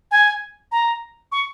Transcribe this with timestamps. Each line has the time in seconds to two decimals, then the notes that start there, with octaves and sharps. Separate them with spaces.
0.11 G#5
0.72 A#5
1.32 C#6